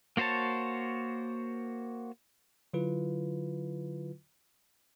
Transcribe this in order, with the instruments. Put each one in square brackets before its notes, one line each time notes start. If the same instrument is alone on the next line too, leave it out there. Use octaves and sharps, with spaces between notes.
[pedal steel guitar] A#3 F#4 C5 C#5 A5
[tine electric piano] D3 F#3 E4 F4 B4